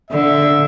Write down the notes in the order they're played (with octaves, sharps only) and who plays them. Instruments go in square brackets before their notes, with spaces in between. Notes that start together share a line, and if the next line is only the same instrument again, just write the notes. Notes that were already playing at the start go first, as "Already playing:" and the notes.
[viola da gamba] D3 [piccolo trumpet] E5